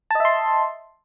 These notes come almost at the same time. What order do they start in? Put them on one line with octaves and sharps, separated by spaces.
A5 D#5 E5 C6